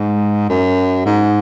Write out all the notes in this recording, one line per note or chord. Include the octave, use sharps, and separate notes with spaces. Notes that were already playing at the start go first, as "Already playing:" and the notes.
Already playing: G#2
F#2
G#2